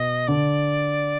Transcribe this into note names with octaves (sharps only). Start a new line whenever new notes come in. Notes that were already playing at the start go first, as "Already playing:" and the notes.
Already playing: B2 D#5
D3 D5